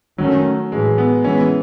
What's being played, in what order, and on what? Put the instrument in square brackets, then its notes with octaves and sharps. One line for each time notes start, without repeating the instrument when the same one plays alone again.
[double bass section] D#3 A3 C#4 [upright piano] F#3
[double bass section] A2 E3 A3 [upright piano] G#3
[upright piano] B3
[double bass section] E3 G#3 B3 [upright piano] C#4